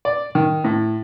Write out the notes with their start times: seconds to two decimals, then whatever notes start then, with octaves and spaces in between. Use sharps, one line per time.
0.05 D5
0.35 D#3
0.64 A2